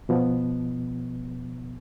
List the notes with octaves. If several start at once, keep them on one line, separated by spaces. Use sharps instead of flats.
B2 F3 B3